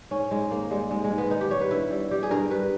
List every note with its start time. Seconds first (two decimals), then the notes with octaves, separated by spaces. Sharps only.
0.11 G#2 C#4
0.31 G#2 G#3
0.51 D#3 A#3
0.71 G3 G#3
0.91 G#2 G#3
1.04 G#3
1.11 G#2
1.18 B3
1.31 D#3 D#4
1.41 G4
1.51 G3 C#5
1.61 B4
1.71 G2 E4
1.91 G3
2.11 G3 G4
2.23 G#4
2.31 G2 A#4
2.50 G2 B4